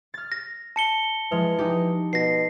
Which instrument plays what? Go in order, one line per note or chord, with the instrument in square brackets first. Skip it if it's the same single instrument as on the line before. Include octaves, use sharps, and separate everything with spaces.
[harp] F6 A6
[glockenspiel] A#6
A5 C#7 G7
[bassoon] E3 [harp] F3 G#3 F6
[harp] D#4 G4
[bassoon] B2 [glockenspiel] A#6 C7